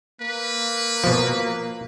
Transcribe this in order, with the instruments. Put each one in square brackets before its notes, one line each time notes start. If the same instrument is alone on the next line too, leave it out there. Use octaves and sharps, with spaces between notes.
[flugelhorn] A#3 [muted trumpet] B4
[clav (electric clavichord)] B2 F3